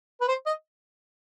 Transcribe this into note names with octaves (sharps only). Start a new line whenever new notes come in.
B4
C5
D#5